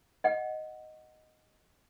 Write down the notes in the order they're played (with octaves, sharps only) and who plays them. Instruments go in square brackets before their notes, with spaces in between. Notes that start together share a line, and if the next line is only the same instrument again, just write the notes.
[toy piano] D#5 F#5